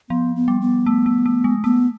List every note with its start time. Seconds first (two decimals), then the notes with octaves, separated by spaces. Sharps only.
0.09 F3 B3
0.36 B3
0.48 G3
0.61 B3
0.86 A3
1.06 A3
1.26 A3
1.44 G#3
1.64 A3 B3